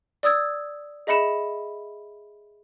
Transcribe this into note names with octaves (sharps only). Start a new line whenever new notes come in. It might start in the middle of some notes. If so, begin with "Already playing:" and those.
D5 D#6 E6 G#6
G#4 D#5 E5 B5 C#7 E7